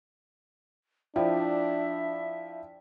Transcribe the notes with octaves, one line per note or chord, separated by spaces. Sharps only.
F3 D4 E4 D5 E5 G5